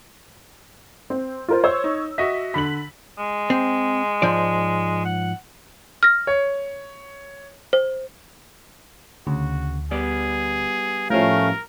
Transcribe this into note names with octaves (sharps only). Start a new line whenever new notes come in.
C4
F4 A#4 C5
C5 C#5 E6
D#4
F#4 D#5 E5 B6
D3 B5 B6 F#7
G#3
C4
G#2 F3 D5
F#5
F6 A#6
C#5
C5
D2 C#3 F#4
G3 B3 G#4 D5
A2 F3 A3 C#4 A#4 F5